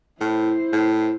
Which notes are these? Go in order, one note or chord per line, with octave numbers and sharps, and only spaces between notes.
A2 E4 C5
A2